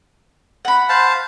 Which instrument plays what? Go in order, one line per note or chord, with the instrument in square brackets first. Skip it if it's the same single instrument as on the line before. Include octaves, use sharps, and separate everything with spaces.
[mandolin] F#5 B5
[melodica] C5 F5 A5